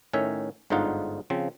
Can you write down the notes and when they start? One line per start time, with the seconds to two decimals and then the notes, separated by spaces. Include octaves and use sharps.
0.13 A2 D#3 C#4 C#5 E5
0.70 G1 G#2 D3 D#4 F4 F#5
1.30 C#3 F3 C4